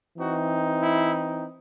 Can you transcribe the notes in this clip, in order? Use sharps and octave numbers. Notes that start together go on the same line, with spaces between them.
E3 C4 D#4 F#4
E4